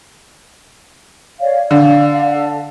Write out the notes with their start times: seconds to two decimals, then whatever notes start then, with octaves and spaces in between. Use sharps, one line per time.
1.41 C#5 D5 F5
1.71 D3 D5 F5
2.34 A4